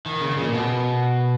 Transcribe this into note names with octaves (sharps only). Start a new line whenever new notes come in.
D#3
C#3
A#2
B2